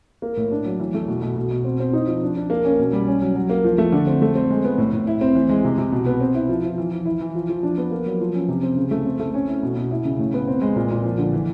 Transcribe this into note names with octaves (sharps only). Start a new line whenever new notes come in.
A#3
A2
D4
F#3
E3
A3
B2
B2
B2
B2
C4
C4
D#4
F3
D4
D4
A#3
C#4
B2
G3
C#4
F#3
F#3
A#3
F3
A3
D3
C4
A3
C4
G#3
B3
A2
A2
E4
C4
E3
G#3
C3
C3
B2
B3
C4
E4
F3
F3
E3
E3
E4
E3
F3
F3
D4
B3
A#3
F#3
F3
C#4
C3
C4
C#3
A3
C4
A3
C#4
E4
B2
B2
E4
C#3
A2
B3
C4
G#3
A#2
A#2
F3
D3
E3